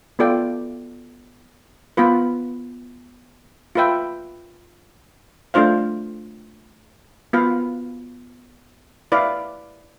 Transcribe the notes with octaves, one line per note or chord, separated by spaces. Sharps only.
B3 F4 A4 D5 G5
B3 F4 B4
F4 B4 E5 G5
A3 D4 F4 C5 F5
B3 F4 B4 F5
E4 B4 D5 F5